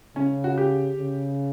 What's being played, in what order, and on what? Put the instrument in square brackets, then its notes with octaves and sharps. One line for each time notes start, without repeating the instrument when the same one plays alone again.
[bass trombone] C#3 [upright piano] C#4
[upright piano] F#4
G4
[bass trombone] C#3